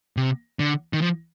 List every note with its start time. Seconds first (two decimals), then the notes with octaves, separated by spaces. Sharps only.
0.17 C3
0.59 D3
0.93 D#3
1.02 F3